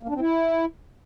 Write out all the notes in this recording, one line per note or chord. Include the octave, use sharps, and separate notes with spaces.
A#3
D4
C4
E4